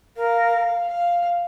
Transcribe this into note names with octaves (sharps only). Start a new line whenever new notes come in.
A#4 F5
F5